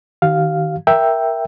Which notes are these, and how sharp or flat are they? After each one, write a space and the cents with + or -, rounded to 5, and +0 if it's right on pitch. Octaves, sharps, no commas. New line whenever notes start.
D#3 +0 G4 -45 F5 +0
A#4 +5 E5 +0 G5 +0